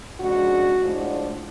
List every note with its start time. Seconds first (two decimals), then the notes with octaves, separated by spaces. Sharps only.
0.20 F2 C#3 G#3 D4 F#4
0.80 A2 F3 G#3 D4